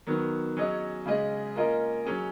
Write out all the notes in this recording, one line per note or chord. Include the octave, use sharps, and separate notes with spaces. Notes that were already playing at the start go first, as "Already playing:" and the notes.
D#3 F#3 B3
F#3 C#4 G#4 D#5
C#3 G#3 C#4 G#4 D#5
A#3 C#4 F4 A#4 D#5
F#3 C#4 G#4